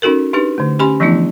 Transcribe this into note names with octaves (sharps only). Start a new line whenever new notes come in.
C#4 D#4 F#4 A4 A#4
D4 D#4 G4 B4
D3 A3
C#4 G4 G#5 B5 C6
E3 F3 A3 B3 D4 E4